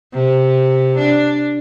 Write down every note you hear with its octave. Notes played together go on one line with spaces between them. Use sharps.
C3
D4